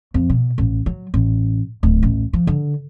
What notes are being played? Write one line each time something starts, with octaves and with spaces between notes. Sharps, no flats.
F2
B2
A1
F#3
A1
D1
A1
F3
D3